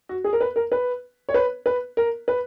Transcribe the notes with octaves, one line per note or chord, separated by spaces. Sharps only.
F#4
G#4
A#4
B4
A#4
B4
C#5
B4
B4
A#4
B4